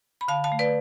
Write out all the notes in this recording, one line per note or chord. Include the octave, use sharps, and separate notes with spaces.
B5
D3 F5 A5
F5 A5
A3
B4 D5